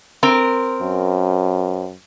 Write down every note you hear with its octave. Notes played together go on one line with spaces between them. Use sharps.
C4 A#4
F#2